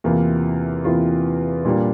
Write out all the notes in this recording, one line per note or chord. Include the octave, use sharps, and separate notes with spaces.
E2 C3 E3 A#3 F4
E2 C3 E3 A#3 F4
A#2 G3 A#3 D4